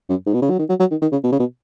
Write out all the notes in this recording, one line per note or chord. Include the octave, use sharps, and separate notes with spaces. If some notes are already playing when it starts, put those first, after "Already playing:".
F#2
G#2
B2
C#3
F#3
D#3
F#3
F#3
D#3
D#3
C#3
B2
C#3
B2